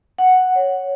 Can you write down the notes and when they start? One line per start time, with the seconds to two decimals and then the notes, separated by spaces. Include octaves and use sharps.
0.18 F#5
0.56 C#5